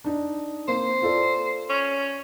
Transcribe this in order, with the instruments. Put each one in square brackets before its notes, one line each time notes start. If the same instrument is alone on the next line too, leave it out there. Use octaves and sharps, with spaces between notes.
[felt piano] D4 D#4
[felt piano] A#3 C4 [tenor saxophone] C5
[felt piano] F4 A4 D5
[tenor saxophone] C#4